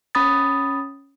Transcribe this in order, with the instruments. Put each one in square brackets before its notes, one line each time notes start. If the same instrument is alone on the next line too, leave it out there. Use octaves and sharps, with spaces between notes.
[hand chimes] C#4 B5 D#6 A6